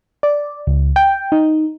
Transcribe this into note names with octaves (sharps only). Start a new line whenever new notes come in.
D5
C#2
G5
D#4